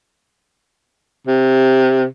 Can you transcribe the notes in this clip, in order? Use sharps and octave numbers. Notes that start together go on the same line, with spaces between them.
C3